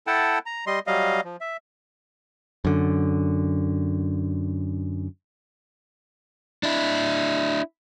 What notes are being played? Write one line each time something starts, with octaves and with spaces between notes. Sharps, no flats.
E4 A4 F#5 G5 A5
A#5
G3 D#5 C6
F#3 G3 D#5 F5
F3
E5
F#2 D3
D4 E4